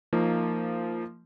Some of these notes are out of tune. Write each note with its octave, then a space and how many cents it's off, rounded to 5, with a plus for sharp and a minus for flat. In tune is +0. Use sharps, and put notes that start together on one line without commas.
F3 -15 A#3 -20 D#4 +5